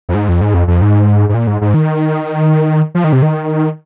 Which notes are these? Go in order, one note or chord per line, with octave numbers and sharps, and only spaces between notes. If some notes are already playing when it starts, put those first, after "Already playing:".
F2
G#2
F2
G#2
F2
F2
G#2
G#2
A#2
G#2
G#2
D#3
F3
D#3
C3
D#3